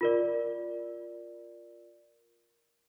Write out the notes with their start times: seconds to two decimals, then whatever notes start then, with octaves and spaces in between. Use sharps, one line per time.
0.01 F4 A#4 D5